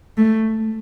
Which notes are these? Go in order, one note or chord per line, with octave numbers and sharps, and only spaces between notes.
A3